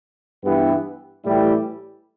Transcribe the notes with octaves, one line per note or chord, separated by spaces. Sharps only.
G2 E3 B3 E4 G4
A2 E3 G3 E4 G4